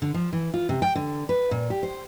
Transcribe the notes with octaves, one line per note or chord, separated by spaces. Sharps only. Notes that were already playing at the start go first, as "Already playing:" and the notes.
D3
F3
E3
F4
C3
G5
D3
B4
A#2
G4
C5